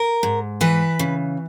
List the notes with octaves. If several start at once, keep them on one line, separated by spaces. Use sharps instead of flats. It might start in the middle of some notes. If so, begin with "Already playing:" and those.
Already playing: A#4
G#2
E3 B4
C#3